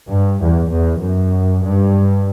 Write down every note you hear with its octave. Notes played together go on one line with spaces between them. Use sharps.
G2
E2
E2
F#2
G2